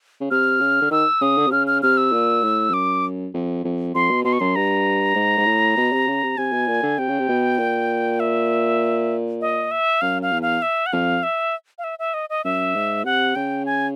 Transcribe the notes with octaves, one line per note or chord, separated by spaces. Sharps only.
C#3
C3 F6
C#3
D3
D#3 E6
C#3 D#6
D3
C3
C#3 F6
F6
C3 F6
E6
A#2
A2
F2
F#2 D6
F2
F2
F2 C6
B2
B2 C6
C#6
F#2 C6
G2 A#5
G#2
G#2
A2
B2
C3
C#3
C3
C3 G#5
B2
A#2
D3
C3 G5
C#3
C3
B2
A#2
E5
D#5
E5
F#2 F5
F5
E2
F5
E5
F#5
F2 F5
E5
F5
E5
E5
D#5
D#5
F#2 E5
G#2
C3 F#5
C#3 G5
G#5